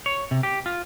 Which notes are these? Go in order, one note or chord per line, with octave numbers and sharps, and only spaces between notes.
C#5
C3
G4
F4